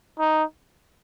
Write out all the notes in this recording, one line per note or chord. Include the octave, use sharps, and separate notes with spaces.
D#4